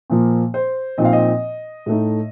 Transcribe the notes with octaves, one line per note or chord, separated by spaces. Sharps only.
A#2 F3 A#3
C5
A#2 F3 C4 D#4 D#5
F5
D#5
A2 A3 D#4